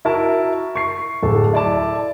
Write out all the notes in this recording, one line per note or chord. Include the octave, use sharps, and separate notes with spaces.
E4 F#4 A#4 A5
C#6 C7
D1 A4
E4 D5 A5